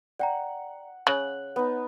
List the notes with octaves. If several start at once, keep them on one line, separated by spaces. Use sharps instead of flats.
D5 F#5 G5 A#5
C#3 C#5 F#6 F#7
B3 D#4